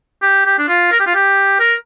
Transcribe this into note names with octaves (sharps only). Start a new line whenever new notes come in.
G4
G4
D4
F4
A#4
G4
F4
G4
A#4